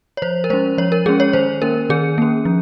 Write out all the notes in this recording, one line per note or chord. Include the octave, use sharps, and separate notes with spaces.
C#5
F3 C5
A#4
G#3 C#4 C5
F3 C#5
A#4
G#3 C#4 G#4
C#5
D#3 C5
A#3 C#4 A#4
D#3 G#4
A#3 C#4
F3